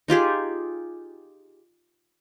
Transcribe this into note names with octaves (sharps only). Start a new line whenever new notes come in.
D#4 F4 G4 G#4